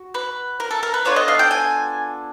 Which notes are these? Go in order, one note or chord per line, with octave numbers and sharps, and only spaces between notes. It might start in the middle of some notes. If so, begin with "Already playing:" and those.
Already playing: F#4
B4
A#4
A4
A#4
B4
B3 D4 F4 A4 C#5
D#5
F5
G5
G#5